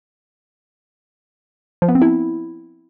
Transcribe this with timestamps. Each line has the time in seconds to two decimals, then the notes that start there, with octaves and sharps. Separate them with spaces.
1.82 F3
1.89 B3
1.95 C4
2.02 E4